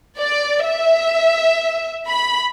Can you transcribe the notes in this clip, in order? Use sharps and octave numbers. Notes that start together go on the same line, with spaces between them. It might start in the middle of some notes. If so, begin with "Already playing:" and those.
D5
E5
B5